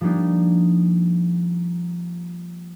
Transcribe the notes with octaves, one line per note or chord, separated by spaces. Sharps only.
F3 G3 A#3 D4 D#4